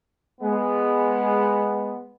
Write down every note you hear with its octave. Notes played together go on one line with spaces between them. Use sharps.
G#3 B3